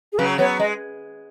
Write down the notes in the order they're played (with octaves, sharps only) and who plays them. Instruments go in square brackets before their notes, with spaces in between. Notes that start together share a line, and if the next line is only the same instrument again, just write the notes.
[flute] G#4
[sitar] C#3 F#3 [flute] B4
[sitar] F#3 B3 [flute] C#5
[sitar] G#3 [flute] D#5